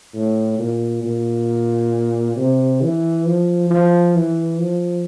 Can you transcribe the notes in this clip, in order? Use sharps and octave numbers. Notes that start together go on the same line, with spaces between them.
A2
A#2
A#2
C3
E3
F3
F3
E3
F3